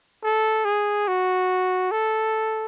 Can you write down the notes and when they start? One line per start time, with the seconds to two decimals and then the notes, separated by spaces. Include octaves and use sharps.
0.23 A4
0.65 G#4
1.08 F#4
1.91 A4